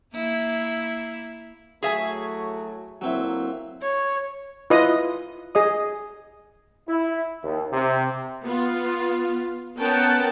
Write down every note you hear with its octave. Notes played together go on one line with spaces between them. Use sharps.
A#3 E4
A2 F#3 A3 G#4 E5 G#5
D2 F#3 A#3 C4 E4
C#5
E4 F4 B4 D#5 D#6
G#4 D#5 D#6
E4
D#2
C3
B3 F4
B3 C#4 A#4 F#5 G5 A5